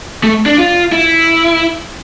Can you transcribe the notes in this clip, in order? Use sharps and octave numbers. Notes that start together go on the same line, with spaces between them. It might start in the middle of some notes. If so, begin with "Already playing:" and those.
A3
D4
F4
E4